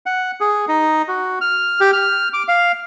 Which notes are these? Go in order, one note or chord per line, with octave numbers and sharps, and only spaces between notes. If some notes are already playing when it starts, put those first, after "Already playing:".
F#5
G#4
D#4
F#4
F6
G4
F6
D6
F5